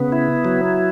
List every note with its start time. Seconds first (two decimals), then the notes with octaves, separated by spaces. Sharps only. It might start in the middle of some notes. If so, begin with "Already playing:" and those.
Already playing: C#3 B3
0.12 E4
0.45 F#3